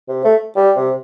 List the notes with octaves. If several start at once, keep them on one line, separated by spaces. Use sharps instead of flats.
C3
A3
G3
C3